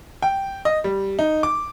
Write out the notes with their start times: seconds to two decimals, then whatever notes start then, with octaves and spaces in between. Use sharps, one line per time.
0.22 G5
0.65 D#5
0.84 G3
1.19 D#4
1.43 D6